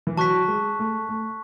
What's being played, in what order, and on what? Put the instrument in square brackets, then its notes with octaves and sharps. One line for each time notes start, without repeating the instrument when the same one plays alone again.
[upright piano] E3
[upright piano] F#3 [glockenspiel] A5 C#6 F#6 B6
[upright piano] G#3
A3
A3